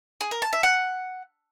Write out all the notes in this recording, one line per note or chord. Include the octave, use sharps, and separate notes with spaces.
G#4
A#4
A5
E5
F#5